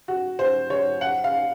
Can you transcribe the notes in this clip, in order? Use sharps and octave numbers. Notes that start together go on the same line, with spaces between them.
F#4
C5
C#5
F#5
F5